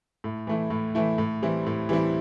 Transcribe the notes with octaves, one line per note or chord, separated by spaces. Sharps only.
A2
E3 A3 E4
A2
E3 A3 E4
A2
E3 G3 C4 E4
A2
E3 G3 C4 E4